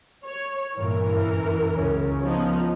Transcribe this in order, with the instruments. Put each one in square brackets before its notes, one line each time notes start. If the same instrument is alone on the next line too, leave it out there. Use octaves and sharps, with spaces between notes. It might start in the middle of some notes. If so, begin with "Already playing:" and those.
[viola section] C#5
[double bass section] G2 A#2 [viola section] E3 A#4
[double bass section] F#2
C#2 C#3 C#4
[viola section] F3 B3 D#4